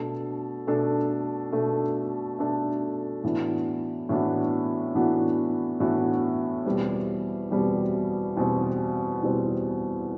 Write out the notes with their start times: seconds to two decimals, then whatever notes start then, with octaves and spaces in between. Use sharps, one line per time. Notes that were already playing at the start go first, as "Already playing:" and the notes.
Already playing: B2 A3 D4 A4
0.67 B2 A3 D4 A4
1.52 B2 A3 D4 A4
2.38 B2 A3 D4 A4
3.23 A2 E3 B3 D4 F#4
4.09 A2 E3 B3 D4 F#4
4.95 A2 E3 B3 D4 F#4
5.80 A2 E3 B3 D4 F#4
6.66 E2 B2 G3 C4
7.51 E2 B2 G3 C4
8.37 E2 B2 G3 C4
9.23 E2 B2 G3 C4